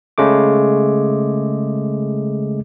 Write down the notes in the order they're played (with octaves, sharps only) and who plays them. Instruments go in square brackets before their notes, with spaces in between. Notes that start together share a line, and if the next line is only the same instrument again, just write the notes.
[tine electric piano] C#3 G#3 A3 D6